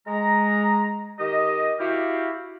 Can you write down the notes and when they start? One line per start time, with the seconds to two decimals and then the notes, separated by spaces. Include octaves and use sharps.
0.07 G#3 A#5
1.19 D#3 G4 D#5
1.79 E4 F#4 G4 F5